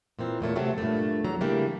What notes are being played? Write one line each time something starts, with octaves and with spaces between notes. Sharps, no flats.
A#2 E3 C4
E2 A#2 A3 C#5
C3 F#3 A3 C4
G2 A#2 A3
E2 F#3 A#5
C#3 E3 G3 A3 A#3 D4